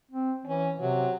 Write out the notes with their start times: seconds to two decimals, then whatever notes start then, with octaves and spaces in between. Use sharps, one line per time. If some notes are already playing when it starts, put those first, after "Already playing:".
0.12 C4
0.46 E3 C#4
0.80 C3 F#3